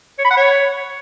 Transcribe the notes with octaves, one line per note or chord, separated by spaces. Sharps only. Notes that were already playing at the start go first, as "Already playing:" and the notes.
C#5
B5
F#5
C#5